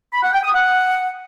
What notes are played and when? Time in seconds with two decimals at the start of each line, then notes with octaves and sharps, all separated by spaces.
0.13 B5
0.23 F#5
0.33 G5
0.43 D#6
0.54 F#5